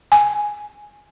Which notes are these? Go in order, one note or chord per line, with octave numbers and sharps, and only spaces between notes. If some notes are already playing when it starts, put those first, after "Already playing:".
G#5